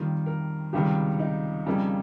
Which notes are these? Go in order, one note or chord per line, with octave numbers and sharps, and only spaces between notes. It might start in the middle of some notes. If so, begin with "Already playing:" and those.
Already playing: F2 D#3 G3 A#3 F4
A#4
C#2 C3 D#3 G3 G4
D#4
F2 C#3 G3 A#3